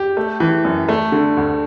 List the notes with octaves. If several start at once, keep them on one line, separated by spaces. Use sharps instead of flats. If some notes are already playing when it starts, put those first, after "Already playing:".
Already playing: G4
A3
E3
F#2
A3
D3
D2